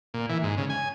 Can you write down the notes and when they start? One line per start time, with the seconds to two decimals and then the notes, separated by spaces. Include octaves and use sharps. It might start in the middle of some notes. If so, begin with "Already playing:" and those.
0.14 A#2
0.29 E3
0.43 G#2
0.58 C#3
0.70 G#5